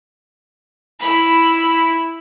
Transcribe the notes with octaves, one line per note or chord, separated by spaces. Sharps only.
E4 B5